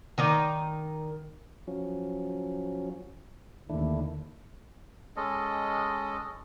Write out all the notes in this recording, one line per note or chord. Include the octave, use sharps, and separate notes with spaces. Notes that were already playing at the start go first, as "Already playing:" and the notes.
D#3 D#4 D5
F3 F#3 C#4
D#2 D3 A3 D4 E4
G#3 C#4 A4 D#5